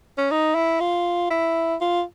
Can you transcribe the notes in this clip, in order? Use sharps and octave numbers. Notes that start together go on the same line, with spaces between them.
C#4
D#4
E4
F4
E4
F4